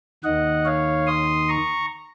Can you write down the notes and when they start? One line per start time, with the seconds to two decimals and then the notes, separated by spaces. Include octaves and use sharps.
0.24 D#2 D#3 D#5 F#5
0.65 C#5 F5
1.07 C6 D#6
1.48 A#5 C#6